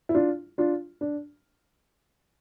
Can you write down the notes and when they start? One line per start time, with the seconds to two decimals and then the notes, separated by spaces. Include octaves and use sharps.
0.09 E4
0.14 D4 F4
0.58 D4 F4
1.01 D4